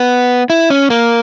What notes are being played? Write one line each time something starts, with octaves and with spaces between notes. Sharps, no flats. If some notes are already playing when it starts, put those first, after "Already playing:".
Already playing: B3
E4
C#4
A#3